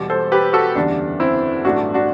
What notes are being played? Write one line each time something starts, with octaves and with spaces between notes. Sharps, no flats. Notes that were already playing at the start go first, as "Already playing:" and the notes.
Already playing: E1 E2 B2 G3
A4 C5
G4 B4
F#4 A4
F#1 E2 D3 G3 D4
C4 E4
A1 G2 F#3 A3 D4 F#4
D4 F#4